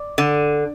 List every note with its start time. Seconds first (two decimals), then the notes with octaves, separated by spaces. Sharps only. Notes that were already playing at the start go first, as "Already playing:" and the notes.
Already playing: D5
0.18 D3